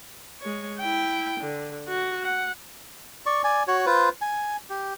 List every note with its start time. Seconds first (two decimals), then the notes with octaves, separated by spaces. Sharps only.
0.41 G#3 C#5
0.79 E4 G5
1.41 D3
1.88 F#4
2.23 F#5
3.26 D5 C#6
3.44 D5 G#5
3.68 F#4 C#5
3.86 F4 B4 C5
4.21 G#5
4.70 G4